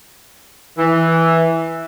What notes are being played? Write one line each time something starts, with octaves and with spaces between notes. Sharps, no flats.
E3